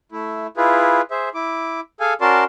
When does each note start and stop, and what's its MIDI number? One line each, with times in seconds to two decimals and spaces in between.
0.12 0.47 57
0.12 0.47 64
0.57 1.01 64
0.57 1.01 65
0.57 1.01 68
0.57 1.01 71
1.11 1.29 68
1.11 1.29 72
1.11 1.29 76
1.35 1.80 64
1.35 1.80 86
2.00 2.13 68
2.00 2.13 69
2.00 2.13 77
2.00 2.13 80
2.21 2.44 61
2.21 2.44 66
2.21 2.44 70
2.21 2.44 74
2.21 2.44 81
2.21 2.44 84